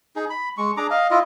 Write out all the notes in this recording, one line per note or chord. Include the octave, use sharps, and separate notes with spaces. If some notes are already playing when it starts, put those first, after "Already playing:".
D#4 G#4
B5
G#3 C#6
D4 G#4 A#5 D6
D#5 F5
E4 F4 D#5